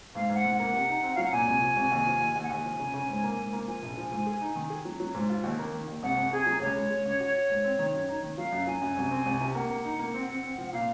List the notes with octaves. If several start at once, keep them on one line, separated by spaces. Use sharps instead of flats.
G#2 F5
G#2
F#5
G#2
A#3 F#5
C3
D#4
C4
F#3 F5
F#5
A#2 G#5
C2
F3
C2
D#2
F3
D#2
D#2
F#5
D#2 G#5
F3
C#3
C#3
G#2
A#3
G#2
A#3
F3 G#5
A#1
F3
G#2
G#4
D#4
D#3
G#4
F#3
F#3
G#2
F4
D#2
A#3
D#3
D#2
C2 F#5
C2
C3 G#4
F#3
C#2 C#5
G#3
G#3
C#2
F#4
F#4
G#2
C4
D#3
F#2
D#4
D#3
F#3 F5
F#2
F#3 G#5
F#2
C2
C4
C2
C3
A#3 F#5
A#3
D#4
A#3
C4
C4
C4
F3
F#5
A#2 F5